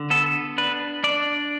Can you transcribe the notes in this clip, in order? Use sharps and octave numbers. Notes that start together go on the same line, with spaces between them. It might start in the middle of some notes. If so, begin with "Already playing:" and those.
Already playing: D3
B3 A4
D4 B4
D4 D5